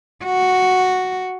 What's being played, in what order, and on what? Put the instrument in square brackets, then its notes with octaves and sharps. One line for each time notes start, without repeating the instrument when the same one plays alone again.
[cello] F#4